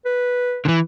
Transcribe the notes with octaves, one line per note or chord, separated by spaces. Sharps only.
B4
D3 E3